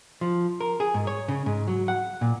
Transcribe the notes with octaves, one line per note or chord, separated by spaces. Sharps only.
F3
A#4
G#4
G#2
C#5
C#3
G#2
F#3
F#5
A#2